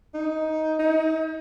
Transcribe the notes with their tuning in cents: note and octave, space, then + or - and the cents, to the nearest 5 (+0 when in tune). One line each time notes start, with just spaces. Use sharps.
D#4 +10
D#4 +45